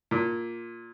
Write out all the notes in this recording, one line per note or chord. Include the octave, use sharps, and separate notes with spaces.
A#2